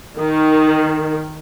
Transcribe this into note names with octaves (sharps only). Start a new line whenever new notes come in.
D#3